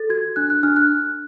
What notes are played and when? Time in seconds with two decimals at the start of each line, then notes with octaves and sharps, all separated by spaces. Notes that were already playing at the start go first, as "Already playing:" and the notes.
Already playing: A4 A6
0.09 F#4 G#6
0.36 D4 F#6
0.50 F#6
0.63 D4 F6
0.76 F#6